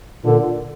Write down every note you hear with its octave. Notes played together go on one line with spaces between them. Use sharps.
A#2 D3